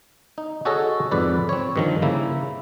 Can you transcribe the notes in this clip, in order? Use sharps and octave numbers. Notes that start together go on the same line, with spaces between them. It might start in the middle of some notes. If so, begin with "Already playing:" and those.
D#4
F#4 G#4 A4 C#5 D#5
F2 G#2 B4 D5
C4 C#5
G2 D#3 F3
C#3 A#3 E4